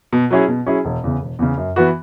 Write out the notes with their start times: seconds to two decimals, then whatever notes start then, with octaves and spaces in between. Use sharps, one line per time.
0.13 B2
0.31 F#3 C#4 E4 G#4
0.48 B2
0.66 F#3 C#4 E4 G#4
0.85 E1
1.04 E2 C#3
1.21 E1
1.39 E2 C#3
1.57 F#2
1.76 E3 B3 F#4